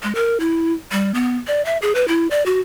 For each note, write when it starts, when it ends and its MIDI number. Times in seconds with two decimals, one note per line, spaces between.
0.03 0.13 56
0.15 0.37 70
0.40 0.73 64
0.92 1.11 55
1.14 1.36 59
1.47 1.62 74
1.65 1.77 76
1.82 1.93 68
1.95 2.07 71
2.08 2.27 64
2.31 2.45 74
2.46 2.60 66